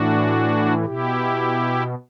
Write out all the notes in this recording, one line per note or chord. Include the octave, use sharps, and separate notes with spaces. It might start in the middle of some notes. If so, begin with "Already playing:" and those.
Already playing: A2 E3 D4 F#4
B2 E4 G4